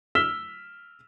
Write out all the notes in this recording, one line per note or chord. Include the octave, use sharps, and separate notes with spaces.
E6 F6 B6 E7 G7